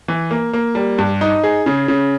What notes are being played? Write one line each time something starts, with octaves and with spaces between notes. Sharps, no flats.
E3
A#3
A#3
G3
G2
D#4
G#4
C#3
C#3